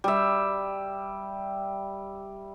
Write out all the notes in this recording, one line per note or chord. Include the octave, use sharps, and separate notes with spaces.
G3 E5